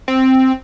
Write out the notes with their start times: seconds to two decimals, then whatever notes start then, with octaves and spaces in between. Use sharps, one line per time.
0.08 C4